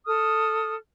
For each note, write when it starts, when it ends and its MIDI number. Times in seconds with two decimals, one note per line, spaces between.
0.06 0.74 69
0.06 0.74 87
0.06 0.74 89